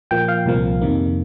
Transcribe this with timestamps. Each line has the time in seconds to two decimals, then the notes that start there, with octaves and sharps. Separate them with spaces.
0.11 A#2 F3 A#3 G5
0.28 F5
0.46 C2 A#2 F3 A#3
0.81 F2 C3 D#3 A#3